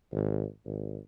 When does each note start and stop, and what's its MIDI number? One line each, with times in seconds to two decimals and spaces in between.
0.11 0.44 32
0.66 0.98 32